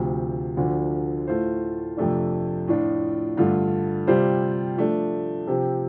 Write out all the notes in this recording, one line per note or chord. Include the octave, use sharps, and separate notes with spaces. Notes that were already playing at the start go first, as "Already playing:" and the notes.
Already playing: D2 C3 F3
D2 D3 F3 A3
A2 A3 F4 C5
F2 C3 A3 D4
A2 F3 D4 F4
G2 D3 A3 F4
C3 G3 F4 C5
F3 A3 D4
C3 F3 C4 G4